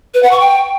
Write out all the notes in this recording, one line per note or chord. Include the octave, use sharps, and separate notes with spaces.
B4
F#5
C#6
G5